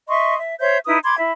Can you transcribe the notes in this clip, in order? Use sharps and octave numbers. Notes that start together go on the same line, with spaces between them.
D#5 E5 C6 C#6
E5
C5 C#5 E5 G6
D#4 E4 B4 D#6
B5 C6 D6 G#6
E4 E5 B5